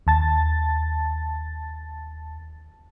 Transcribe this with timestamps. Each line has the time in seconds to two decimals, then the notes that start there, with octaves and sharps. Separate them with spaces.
0.07 D#2 A5 A6